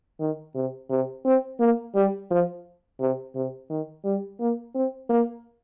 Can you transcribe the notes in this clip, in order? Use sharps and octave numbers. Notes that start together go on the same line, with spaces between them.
D#3
C3
C3
C4
A#3
G3
F3
C3
C3
D#3
G3
A#3
C4
A#3